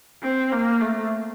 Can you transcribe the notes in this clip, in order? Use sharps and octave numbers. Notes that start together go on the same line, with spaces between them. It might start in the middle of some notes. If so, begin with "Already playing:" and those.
C4
A#3
A3